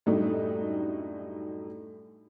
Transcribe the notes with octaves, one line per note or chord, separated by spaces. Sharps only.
F#2 A2 G3 A3 D4 D#4